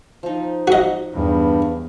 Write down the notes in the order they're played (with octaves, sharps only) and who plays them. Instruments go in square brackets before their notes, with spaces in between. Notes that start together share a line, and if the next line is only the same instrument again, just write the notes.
[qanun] F3 D#4
[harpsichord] F#4 D#5
[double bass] E2 [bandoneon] G2